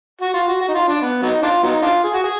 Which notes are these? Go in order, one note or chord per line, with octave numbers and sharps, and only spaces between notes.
F#4
F4
F#4
F#4
D#4
F4
D4
B3
F#3 B3 D#4
D4 F4
F#3 B3 D#4
D4 F4
G#4
F#4
G#4